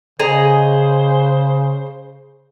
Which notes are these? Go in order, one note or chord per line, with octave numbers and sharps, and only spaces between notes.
C#3 G#4 C5 D#5 A#5